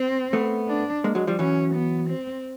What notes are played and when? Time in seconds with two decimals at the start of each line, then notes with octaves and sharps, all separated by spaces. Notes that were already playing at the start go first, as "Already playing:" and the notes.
Already playing: C4
0.33 A3 B3
0.68 D4
1.04 G#3 A#3
1.15 F#3 G#3
1.27 F3 G3
1.39 E3 F#3 C#4
1.75 B3
2.10 C4